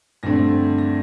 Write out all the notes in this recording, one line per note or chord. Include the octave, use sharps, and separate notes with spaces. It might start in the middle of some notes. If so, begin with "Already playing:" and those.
G2 D3 A3 C4 A#6
A#6